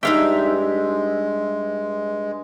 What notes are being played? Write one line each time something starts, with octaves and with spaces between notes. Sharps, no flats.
G2 G#3 D#4 E5 F5 G5 D6